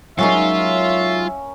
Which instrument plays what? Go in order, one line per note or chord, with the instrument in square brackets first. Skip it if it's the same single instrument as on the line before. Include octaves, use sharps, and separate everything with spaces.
[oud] F#3 G#3 D#4 [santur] A#3 C#4 A#5 [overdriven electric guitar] F4 [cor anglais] E5